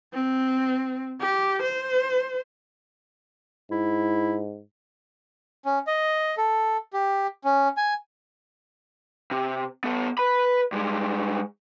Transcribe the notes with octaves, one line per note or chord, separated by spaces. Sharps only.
C4
G4
C5
G#2 E4
C#4
D#5
A4
G4
C#4
G#5
C3
B3 A4
B4 B5
G2 G#3